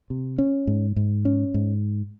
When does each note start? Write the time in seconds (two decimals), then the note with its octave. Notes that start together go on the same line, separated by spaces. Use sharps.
0.10 C3
0.38 C#4
0.67 G#2
0.96 G#2
1.25 C#4
1.54 G#2